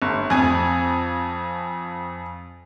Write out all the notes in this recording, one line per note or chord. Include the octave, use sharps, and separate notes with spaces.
G1
F2 G#5